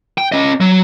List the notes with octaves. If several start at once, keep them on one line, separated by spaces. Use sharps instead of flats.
G5
C#4 D#5
F#3